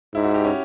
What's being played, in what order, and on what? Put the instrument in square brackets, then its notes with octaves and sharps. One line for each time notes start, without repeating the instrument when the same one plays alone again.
[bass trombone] G#2 [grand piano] E4
[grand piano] F#4
G4
C#4